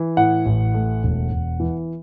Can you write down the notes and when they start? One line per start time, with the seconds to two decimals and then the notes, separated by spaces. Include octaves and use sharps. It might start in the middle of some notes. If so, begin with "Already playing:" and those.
Already playing: E3
0.17 A2 F#5
0.46 A1
0.74 A3
1.03 E1
1.31 E1
1.60 E3